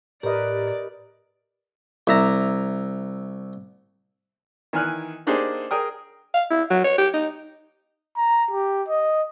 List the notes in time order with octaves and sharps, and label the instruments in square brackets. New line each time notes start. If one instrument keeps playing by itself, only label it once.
[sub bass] A2 [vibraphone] G4 [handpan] A#4 B4 D#5 [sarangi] D5
[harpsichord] C2 E5 A#5
[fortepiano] D#3 E3 G#5 F6 F#6
A#3 D4 D#4 G4 G#4 C5
G#4 A#4 G5 D#6
[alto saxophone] F5
E4
F#3
C#5
G4
D#4
[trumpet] A#5
G4
D#5